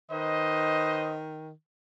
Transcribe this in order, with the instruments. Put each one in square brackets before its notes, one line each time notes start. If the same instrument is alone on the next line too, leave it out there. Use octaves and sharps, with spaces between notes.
[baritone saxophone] D#3 [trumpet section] B4 C5 D#5